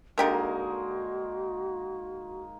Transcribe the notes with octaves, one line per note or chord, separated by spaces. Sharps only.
D3 G#3 A#3 D#4 F#4 G4 A#4